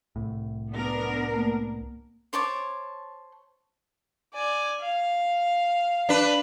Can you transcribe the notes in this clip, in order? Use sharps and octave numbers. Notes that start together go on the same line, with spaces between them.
C2 A2
B3 D4 A#4
A3 A#3
C5 C#5 A5 D6
D5 G#5
F5
D4 B4